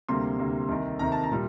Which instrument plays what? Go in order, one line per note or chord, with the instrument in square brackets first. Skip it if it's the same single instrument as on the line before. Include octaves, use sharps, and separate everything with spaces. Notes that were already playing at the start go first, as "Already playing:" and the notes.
[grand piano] D2 C3 G3 A#3 C6
D2 C3 G3 A#3
C2 C3 D#3
C2 C3 D#3 A#5
A5
A#5
A#2 G3